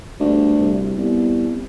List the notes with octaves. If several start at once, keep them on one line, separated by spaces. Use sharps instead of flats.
G1 D2
C2
C2 B3